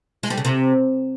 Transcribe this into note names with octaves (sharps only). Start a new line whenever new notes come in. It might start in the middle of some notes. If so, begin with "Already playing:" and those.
G#3
G3
C#3
C3